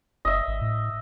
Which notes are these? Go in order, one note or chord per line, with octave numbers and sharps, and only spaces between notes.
F#1 D#5 E5
G#1
A2